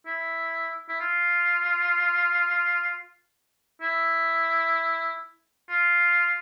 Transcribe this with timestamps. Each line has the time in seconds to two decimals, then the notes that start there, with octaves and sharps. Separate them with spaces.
0.06 E4
0.89 E4
1.00 F4
3.82 E4
5.69 F4